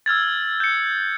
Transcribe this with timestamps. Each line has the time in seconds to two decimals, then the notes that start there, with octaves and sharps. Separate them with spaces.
0.06 E6 F6 G#6 A6
0.60 G6 C#7